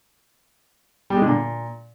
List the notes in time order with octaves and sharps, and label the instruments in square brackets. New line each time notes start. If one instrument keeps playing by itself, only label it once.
[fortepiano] G3
G#3
D3
A#2